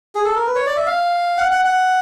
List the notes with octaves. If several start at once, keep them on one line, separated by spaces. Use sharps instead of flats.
G#4
A4
A#4
B4
C#5
D5
E5
F5
F#5
F#5
F#5